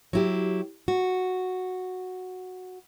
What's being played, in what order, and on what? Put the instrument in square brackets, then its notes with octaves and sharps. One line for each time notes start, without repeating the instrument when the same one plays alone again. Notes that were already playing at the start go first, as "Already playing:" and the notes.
[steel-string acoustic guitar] F#3 E4 G4
F#4